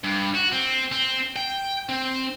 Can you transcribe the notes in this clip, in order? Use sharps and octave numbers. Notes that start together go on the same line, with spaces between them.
G2
F#4
C4
C4
G5
C4